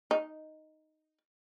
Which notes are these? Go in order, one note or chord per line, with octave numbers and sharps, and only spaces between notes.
D#4